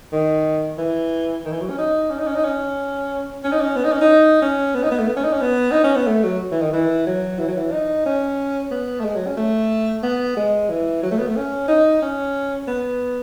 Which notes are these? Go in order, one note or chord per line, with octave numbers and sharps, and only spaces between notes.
D#3
E3
D#3
E3
F#3
C#4
D#4
C#4
D#4
C#4
D#4
C#4
C#4
D#4
C#4
B3
D#4
C#4
D#4
C#4
B3
D#4
B3
A3
B3
C#4
D#4
C#4
B3
D#4
C#4
B3
A3
F#3
E3
D#3
E3
F#3
E3
F#3
E3
D#4
C#4
B3
A3
G#3
F#3
C#4
A3
B3
G#3
E3
F#3
A3
B3
A3
C#4
D#4
C#4
B3